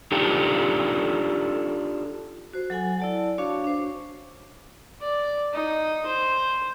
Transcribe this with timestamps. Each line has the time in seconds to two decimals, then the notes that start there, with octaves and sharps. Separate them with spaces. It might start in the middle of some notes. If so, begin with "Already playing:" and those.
0.12 D4 D#4 F4 G4 A4
2.53 F#4 C5
2.70 F#3 A4 F#5 G#5
3.00 E4 D5 A5
3.38 D4 F#4 C#5 F5 C#6
3.64 D4 C5
5.02 D5
5.53 D#4
6.06 C5